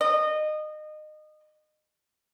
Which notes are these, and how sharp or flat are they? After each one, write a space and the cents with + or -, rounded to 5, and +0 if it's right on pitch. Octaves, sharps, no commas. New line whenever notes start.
D#5 -25